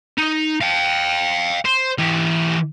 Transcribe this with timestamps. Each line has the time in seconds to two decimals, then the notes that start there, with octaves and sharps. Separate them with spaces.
0.18 D#4
0.62 F5 G5
1.65 C5
1.99 E3 G4